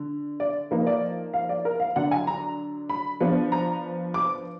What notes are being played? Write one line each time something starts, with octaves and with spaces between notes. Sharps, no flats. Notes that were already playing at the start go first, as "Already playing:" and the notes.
Already playing: D3
D5
F3 A#3 D#4 B4
D5
F5
D5
A#4
F5
D3 F#3 D4 F#5
G#5
A#5
B5
F3 B3 D4
A#5
D6